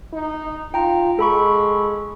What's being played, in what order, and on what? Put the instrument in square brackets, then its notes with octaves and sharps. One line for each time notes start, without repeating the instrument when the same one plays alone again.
[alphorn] D#4
[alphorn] F4 [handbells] G5 A#5
[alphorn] G#3 [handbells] A4 B5 C#6